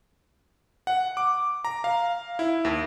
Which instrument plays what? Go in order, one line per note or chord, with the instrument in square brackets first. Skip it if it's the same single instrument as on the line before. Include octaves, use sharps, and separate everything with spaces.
[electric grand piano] F#5
D6
A#5
F5
E4
D#2